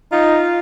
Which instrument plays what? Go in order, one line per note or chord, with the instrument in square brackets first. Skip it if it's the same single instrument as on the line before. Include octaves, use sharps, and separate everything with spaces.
[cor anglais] D#4 [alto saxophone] F4